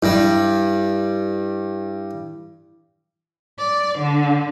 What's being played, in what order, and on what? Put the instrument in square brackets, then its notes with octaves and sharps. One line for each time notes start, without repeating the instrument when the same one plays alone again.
[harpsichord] G2 G3 [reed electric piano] E4
[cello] D5
D3